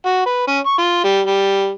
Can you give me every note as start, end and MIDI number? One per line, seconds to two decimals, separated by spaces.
0.05 0.24 66
0.26 0.44 71
0.47 0.58 61
0.66 0.77 85
0.78 1.01 65
1.04 1.20 55
1.26 1.73 55